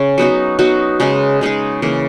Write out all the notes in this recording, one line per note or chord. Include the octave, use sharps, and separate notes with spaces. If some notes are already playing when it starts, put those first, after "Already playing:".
Already playing: C#3 C#4
F#3 B3 D#4 F#4
F#3 B3 D#4 F#4
C#3 G#3 D#4 G#4
C#3 G#3 D#4 G#4
C#3 E3 A#3